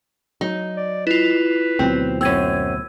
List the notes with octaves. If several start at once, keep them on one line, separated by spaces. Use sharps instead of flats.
F#3 D#4
D5
E4 F4 B4
D2 B2 F#3 C4
F#2 C4 E6 G#6 D#7